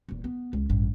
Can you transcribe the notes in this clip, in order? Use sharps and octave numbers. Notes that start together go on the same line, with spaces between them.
D#1 E2
B3
C#2
A1 G2